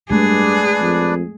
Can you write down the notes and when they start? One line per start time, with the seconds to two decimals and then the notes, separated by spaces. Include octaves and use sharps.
0.11 G2 G#3 A3 D4 G#4 B4 D5
0.82 F2